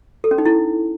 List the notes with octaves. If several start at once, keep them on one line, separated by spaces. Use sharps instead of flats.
A4
C#4
D#4
E4